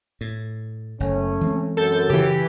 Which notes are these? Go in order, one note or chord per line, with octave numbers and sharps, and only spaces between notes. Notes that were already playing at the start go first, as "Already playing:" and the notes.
A2
F#1 A3 C#4
E3 G#3 C4
F#2 A4 G6 A6
C#3 E3 G4